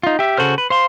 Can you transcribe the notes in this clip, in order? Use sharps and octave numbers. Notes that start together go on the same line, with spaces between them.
D#4 F4
G4 E5
C#3 F#4 A4 C5 F6
B4
C5 F5 C6